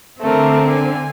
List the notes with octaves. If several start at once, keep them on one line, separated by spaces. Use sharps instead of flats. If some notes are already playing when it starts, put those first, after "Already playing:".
D3 A3 C4 A#4
G#5